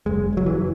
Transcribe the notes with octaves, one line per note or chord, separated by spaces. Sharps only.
F#1 G#3
F#1 F#3
E3